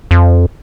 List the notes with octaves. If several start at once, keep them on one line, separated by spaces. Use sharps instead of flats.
F2